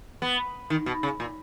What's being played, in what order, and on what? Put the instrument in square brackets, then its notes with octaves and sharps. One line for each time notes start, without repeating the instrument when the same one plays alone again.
[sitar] B3
D#3
B2
C#3
A#2